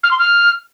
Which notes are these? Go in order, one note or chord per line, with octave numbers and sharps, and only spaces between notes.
F6
C6
F6